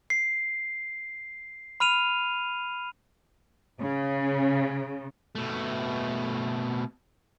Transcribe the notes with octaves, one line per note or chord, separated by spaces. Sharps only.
C7
B5 F6 D#7 F7
C#3
B2 A3